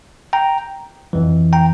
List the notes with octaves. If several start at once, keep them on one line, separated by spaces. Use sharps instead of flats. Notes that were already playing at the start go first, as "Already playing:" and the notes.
G5 A#5
F2 E3
G5 A#5